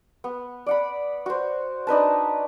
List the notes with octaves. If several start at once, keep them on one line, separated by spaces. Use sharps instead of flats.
B3
D5 F#5 B5
F#4 C5
D4 D#4 B4 A5